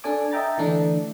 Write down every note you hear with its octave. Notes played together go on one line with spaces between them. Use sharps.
D4 A4 D5 G#5 D6
D#5 E5 G5 A#5 A6
D3 E3 A3 D4